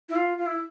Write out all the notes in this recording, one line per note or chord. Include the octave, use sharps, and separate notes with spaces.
E4
F4
F4
E4